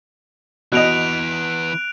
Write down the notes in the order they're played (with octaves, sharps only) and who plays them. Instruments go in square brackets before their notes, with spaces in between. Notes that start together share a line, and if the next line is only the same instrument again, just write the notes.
[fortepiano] B2 D#5 [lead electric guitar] E3 B3 [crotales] F#6 D7 F7